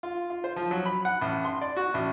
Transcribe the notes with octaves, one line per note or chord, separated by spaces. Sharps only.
F4
F4
C5
F3
F#3
B5
F#5
A1
C6
D5
F#4
A1